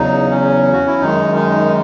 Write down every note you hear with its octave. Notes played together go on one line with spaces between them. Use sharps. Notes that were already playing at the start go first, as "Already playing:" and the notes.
Already playing: E2 C#3 F#3 D#4
C#4
F#4
E4
F#2 D#3 G#3 D#4
D#4